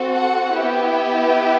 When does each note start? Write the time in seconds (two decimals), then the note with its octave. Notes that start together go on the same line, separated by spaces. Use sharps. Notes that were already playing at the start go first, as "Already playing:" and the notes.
Already playing: C4 F#4 A4
0.14 F#5
0.54 B3 E4 G4